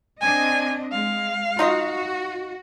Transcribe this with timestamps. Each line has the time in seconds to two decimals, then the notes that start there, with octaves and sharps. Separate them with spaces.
0.21 C4 D4 D#5 G#5
0.92 G#3 F5
1.59 D#4 F4 F#4 D#5